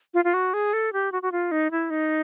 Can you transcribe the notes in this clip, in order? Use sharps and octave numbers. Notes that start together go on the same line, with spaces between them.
F4
F4
F#4
G#4
A4
G4
F#4
F#4
F4
D#4
E4
D#4